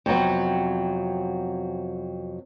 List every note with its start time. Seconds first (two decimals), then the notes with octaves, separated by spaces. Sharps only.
0.06 F2 C3 F#3 B3